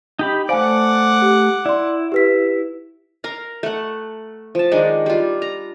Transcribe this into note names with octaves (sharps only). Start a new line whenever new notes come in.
D#4 G4 B5
A3 C5 D5 F5 F#5 G#5 D6
G4
E4 D5 C6
G4 B4 B6
A#4 F5 A#5
A3 F#5
F3 A5
D#3 G#3 D4 D#4
G3 F4
A#5